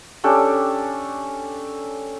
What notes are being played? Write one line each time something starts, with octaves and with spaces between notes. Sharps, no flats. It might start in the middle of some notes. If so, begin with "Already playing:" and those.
C#4 D4 G4 A4